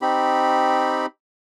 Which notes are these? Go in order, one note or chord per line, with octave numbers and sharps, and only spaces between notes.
C4 D#4 G4 B5